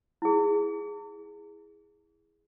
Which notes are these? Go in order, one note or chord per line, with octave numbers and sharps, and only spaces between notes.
E4 G#4